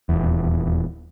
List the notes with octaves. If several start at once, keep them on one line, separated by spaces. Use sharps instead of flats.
D#1 E2